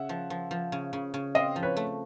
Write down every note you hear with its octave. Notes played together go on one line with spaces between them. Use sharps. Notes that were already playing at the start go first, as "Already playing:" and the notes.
Already playing: C#3 E5 F#5
F3
F3
F3
C#3
C#3
C#3
C4 D#5 F5
F3
B4 C#5
A3